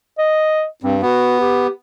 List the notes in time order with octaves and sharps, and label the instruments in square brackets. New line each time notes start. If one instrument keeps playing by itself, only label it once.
[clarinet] D#5
[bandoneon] G2 [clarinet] C4
[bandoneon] B3 [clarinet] F#4
[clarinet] G4